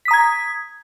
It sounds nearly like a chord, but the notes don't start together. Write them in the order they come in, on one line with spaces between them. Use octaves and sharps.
B6 D#6 A#5 G#6